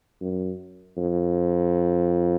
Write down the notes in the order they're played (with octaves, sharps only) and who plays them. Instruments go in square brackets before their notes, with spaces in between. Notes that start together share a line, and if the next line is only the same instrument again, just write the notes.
[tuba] F#2
F2